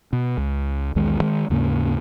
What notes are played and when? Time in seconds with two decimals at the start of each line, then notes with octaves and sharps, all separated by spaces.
0.13 B2
0.37 C#2
0.95 B1 E2 D#3 G#3
1.19 G2 D#3 G#3
1.50 D#2 G#2 C#3 A#3